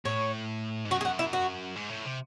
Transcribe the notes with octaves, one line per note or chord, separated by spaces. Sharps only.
A2 C#5
G#2
F#2 F#4
G#4
F#4
E4
F#4
G#2
A2
C3